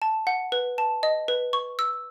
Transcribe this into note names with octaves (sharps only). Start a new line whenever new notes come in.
A5
F#5
B4
A5
D#5
B4
C#6
E6